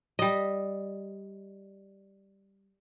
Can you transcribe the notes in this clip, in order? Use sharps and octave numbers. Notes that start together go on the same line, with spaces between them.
G3 D#5